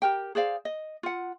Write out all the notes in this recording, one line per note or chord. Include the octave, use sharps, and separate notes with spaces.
G4 A#4 G5
G#4 C5 D5 F5
D#5
F4 F#5